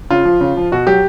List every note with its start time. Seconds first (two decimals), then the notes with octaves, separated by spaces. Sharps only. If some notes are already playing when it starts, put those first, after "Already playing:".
0.10 C#3 F4
0.25 F3
0.41 C#3
0.57 F3
0.72 B2 F#4
0.87 F#3 G4